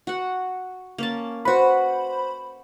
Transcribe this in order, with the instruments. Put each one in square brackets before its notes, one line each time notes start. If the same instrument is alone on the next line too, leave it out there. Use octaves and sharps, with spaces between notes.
[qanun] F#4 F#5
A#3 C#4 A5
[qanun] F#4 B4 [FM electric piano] C5 B5